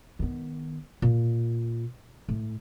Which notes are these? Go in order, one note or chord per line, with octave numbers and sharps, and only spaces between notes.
D#3 B3
A#2
A2